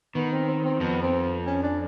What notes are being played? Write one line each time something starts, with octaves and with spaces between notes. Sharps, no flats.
D#3 B3
C4
C4
C4
F2 F3 B3
C4
C#4
D4